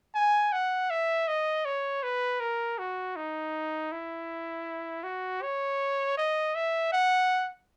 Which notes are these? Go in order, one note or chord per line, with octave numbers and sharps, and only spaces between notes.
G#5
F#5
E5
D#5
C#5
B4
A#4
F#4
D#4
E4
F#4
C#5
D#5
E5
F#5